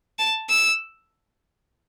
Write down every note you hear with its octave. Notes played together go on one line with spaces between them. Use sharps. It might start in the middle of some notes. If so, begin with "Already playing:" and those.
A5
E6